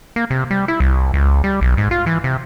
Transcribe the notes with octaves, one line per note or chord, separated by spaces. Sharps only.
A#3
C3
G3
E4
C2
C#2
G3
B1
G#2
F4
E3
C3